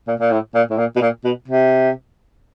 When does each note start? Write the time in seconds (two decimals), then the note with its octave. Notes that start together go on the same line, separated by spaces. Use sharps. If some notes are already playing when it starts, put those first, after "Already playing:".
0.07 A#2
0.19 A#2
0.31 A2
0.55 A#2
0.70 A2
0.78 A#2
0.96 B2
1.01 A#2
1.24 B2
1.48 C3